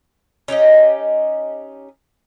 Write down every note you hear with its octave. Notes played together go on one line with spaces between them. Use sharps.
C#4 D#4 G4 D#5